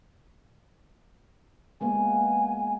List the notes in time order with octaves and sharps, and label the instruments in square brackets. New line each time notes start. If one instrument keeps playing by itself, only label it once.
[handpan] G#3 A#3 B3 [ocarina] G#5